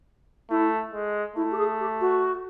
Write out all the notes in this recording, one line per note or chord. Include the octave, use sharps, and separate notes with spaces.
A3 E4
G#3
A3 E4
G4
G#4
G4
F#4